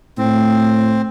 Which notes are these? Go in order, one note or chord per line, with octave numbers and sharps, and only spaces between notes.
A2 C4